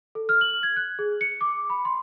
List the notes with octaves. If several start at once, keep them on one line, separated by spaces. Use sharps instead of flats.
A4
F6
F#7
G#6
F#6
G#4
C#7
D6
B5
C6